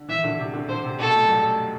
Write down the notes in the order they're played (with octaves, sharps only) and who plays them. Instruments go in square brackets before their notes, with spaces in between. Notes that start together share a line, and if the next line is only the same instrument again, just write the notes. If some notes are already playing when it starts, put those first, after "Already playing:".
Already playing: [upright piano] D3
[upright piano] E3 [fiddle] E5
[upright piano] D3
C3
D3
[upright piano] D3 [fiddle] C5
[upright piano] C3
[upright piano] B2 [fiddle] A4
[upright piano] A2
F#2
G2